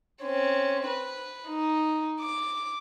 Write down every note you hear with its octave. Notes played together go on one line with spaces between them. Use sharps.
C4 C#4
B4
D#4
D6